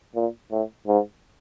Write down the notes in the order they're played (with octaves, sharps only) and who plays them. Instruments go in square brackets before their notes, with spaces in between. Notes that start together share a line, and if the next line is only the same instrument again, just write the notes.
[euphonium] A#2
A2
G#2